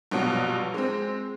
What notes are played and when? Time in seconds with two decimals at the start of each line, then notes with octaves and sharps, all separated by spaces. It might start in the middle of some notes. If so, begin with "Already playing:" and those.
0.11 A#1 G2 B2 F#3
0.74 G#3 C4